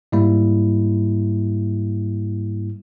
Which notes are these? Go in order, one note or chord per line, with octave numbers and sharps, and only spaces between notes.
G#2 G3 A#3 E4